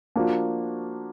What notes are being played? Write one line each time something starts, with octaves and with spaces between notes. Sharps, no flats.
F3 A#3 D4 F#4